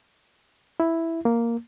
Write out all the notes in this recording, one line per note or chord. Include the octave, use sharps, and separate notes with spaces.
E4
A#3